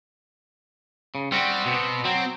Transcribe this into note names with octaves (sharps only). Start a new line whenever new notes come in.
C#3
G3 C4 F#4
B2
F#3 C4